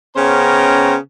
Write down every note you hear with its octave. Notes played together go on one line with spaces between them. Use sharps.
C#3 B3 C#4 C5 G5 A#5